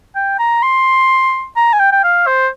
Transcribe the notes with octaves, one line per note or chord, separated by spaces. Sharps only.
G5
A#5
C6
A#5
G#5
G5
G5
F5
C5